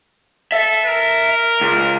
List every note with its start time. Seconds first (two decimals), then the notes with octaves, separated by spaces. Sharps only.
0.52 A4 E5
0.86 A#4
1.61 C#2